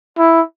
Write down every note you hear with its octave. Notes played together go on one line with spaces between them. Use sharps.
E4